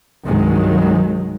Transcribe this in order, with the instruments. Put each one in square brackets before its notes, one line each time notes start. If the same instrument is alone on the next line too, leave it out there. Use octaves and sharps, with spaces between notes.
[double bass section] C2 G2 D#3 F#3 G#3